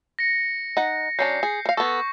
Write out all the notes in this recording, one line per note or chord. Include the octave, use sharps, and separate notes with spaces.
A#6 C#7
D#4 F#5
F#3 C#4 D4 G6 C7
G#4
A#4 F5
B3 A4 C#6